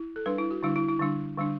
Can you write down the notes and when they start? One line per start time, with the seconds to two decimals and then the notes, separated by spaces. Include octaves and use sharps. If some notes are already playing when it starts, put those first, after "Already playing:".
Already playing: E4
0.16 A4
0.26 G3 D4 B4
0.39 E4
0.51 F#4
0.63 D3 G3 D4 E4
0.76 E4
0.88 E4
1.00 D3 G3 D4
1.38 D3 G3 D4